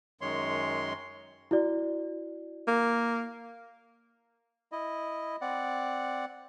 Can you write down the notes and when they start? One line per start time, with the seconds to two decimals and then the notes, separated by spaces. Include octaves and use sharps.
0.21 F#2 D#3 G#3 C#5 C6
1.51 E4 F#4 D5
2.68 A#3
4.72 E4 D#5
5.41 C4 D5 F#5